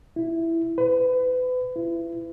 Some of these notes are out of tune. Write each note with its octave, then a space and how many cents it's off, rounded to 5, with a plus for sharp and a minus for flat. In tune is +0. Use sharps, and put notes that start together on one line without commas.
E4 +5
B4 +35
E4 +30